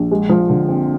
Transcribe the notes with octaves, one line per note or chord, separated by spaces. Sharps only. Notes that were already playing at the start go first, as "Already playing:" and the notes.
Already playing: A#1
G#3
F3
D3
C4